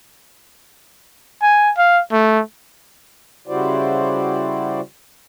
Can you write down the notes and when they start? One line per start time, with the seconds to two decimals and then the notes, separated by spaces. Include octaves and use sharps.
1.42 G#5
1.78 F5
2.12 A3
3.47 C#3 G3 E4 F#4 C5 D5